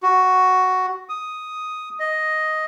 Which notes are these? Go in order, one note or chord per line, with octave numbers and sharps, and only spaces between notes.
F#4
D#6
D#5